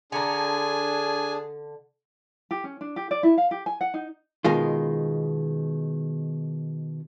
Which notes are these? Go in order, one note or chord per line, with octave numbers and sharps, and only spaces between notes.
D3 D4 G#4 G#5 A#5
G4
C#4
D4
G4
D5
E4
F5
G4
G#5
F#5
D#4
B2 D#3 G#3 F4